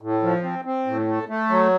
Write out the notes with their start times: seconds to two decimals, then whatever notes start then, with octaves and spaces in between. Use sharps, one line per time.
0.02 A2
0.23 F3
0.43 C4
0.65 C4
0.87 A2
1.08 A3
1.29 A3
1.50 F#3